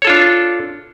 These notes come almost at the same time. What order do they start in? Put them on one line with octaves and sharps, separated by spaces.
C#5 A4 F4 D4